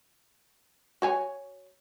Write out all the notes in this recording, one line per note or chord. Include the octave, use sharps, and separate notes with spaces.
F#4 C#5 G#5